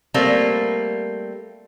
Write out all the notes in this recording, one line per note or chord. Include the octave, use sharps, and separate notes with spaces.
G3 A3 A#3 C4